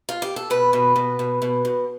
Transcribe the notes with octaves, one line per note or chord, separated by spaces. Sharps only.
F4
G4
A4
B2 B4
B2
B2
B2
B2
B2